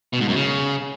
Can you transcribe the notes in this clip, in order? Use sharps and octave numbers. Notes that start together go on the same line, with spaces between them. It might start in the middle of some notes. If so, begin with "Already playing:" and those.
B2
G#2
F#2
C#3